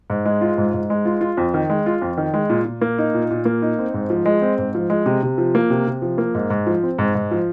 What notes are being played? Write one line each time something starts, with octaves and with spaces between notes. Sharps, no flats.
G#2
G#3
F4
G#2
G#2
G#3
F4
F4
F2
D#3
G#3
F4
F2
D#3
G#3
A#2
A#2
A#3
D#4
A#2
A#2
A#3
D#4
C4
G#2
F3
G#3
C4
G#2
F3
G#3
C3
C3
F3
A#3
C3
C3
F3
A#3
G#2
G#2
F3
C4
G#2
G#2
F3